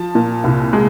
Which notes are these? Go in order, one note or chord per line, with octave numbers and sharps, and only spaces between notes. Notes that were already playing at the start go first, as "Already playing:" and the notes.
Already playing: F3 A5
A#2
C2
G#3